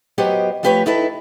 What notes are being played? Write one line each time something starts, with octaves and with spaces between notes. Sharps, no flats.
F#3 B3 G4 C5 D#5
F3 A3 G4 B4 C#5
D#4 E4 A4 B4